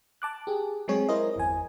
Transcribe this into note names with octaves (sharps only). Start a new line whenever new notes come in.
A5 D6 F#6
G4 G#4
F#3 G#3 C4 G#4 C#5
E4 A#4 C5 D#5
G1 E2 G#5